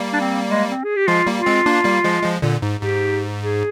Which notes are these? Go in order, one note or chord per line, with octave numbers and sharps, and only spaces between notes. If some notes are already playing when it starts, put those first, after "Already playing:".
Already playing: G3 A#3
D4
C4
G#3
C4
G#4
G4
F3 G#3 F4
G3 A#3
F4
G#3 C4
A#3 D4
G3 A#3
F3 G#3
F3 G#3
A#2 D3
G#2
G#2 G4
G#4